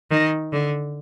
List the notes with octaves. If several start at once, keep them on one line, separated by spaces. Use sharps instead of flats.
D#3
D3